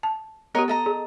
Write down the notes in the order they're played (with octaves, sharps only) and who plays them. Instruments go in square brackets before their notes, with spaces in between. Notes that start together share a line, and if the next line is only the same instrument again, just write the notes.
[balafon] A5
[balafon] B3 G4 [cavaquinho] A#4 C#5 D#5
[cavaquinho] A4 D#5 A#5
[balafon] G#4